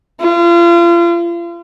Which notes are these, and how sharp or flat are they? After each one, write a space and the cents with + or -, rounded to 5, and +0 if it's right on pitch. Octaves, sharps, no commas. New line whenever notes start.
F4 -35